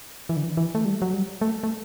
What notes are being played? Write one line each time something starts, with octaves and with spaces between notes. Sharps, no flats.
E3
D3
E3
E3
A3
G3
F#3
G3
A3
A3